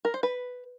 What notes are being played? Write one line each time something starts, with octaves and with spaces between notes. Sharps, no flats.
A#4
C5
B4